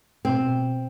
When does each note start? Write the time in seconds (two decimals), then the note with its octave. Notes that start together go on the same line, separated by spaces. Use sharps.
0.25 B2 C4